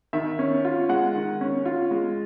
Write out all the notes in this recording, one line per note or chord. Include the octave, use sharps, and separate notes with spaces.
D#3 E5
C#4
F4
G#3 F#5
D#3
C#4
F4
G#3